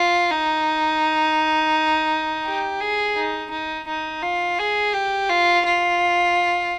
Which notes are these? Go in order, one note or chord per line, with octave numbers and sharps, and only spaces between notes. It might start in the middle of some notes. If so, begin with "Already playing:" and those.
Already playing: F4
D#4
G4
G#4
D#4
D#4
D#4
F4
G#4
G4
F4
F4